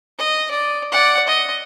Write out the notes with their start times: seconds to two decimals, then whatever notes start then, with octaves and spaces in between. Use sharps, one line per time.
0.18 D#5
0.51 D5
0.92 D5 F#5
1.27 D#5